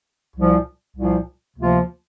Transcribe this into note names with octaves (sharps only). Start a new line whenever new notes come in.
C2 A#2 F3
C2 A#2 F3
D2 C3 F3 A#3 F4